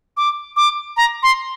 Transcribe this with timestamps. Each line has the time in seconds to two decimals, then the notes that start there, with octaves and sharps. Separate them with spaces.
0.17 D6
0.56 D6
0.97 A#5
1.23 C6